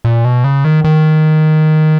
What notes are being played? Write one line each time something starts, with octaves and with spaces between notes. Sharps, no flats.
A#2
B2
C#3
D#3
D#3